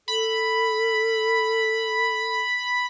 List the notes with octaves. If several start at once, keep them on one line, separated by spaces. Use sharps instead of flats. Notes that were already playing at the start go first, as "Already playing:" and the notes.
A4 B5